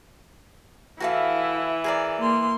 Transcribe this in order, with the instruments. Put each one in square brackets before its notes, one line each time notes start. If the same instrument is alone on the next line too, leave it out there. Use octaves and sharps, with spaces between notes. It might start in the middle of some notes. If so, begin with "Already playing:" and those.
[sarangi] E3 [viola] E4 [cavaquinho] F#4 A4 F5
[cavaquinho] G#4 A#4 D5
[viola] A#3 C6